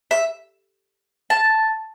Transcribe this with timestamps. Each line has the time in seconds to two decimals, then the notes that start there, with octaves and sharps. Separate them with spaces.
0.11 E5
1.30 A5